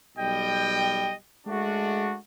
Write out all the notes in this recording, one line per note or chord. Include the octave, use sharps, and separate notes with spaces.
B1 G3 D#5 G5
G#3 A3 D4 F#4